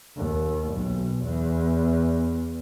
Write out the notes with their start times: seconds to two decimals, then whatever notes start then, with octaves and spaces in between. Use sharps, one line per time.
0.16 D#2
0.73 B1
1.24 E2